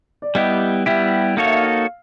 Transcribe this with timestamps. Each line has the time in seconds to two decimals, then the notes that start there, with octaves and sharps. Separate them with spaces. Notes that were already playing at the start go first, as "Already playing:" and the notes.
0.22 D5
0.35 G3 B3 E4 G4 D#5
0.86 G3 B3 E4 G4 E5
1.37 A#3 D#4 F#4 A4 C#5 F5
1.45 E5
1.53 F5
1.63 F5